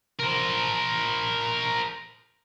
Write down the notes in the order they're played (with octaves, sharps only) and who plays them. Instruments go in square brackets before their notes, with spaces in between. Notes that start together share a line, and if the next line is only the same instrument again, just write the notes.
[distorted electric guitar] A#4 C5